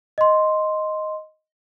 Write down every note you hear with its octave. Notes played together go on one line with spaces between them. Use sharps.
D#5 C6